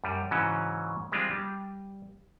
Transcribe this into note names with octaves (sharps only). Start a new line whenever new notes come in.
F#2 G3
G#2 C#3 E3 F#3 C#4
G3 G#3 C4 D4 F4
G3